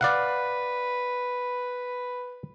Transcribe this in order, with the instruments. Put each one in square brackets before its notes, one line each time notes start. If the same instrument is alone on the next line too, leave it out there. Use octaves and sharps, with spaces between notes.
[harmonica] B4 [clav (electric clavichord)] D5 F5 F#5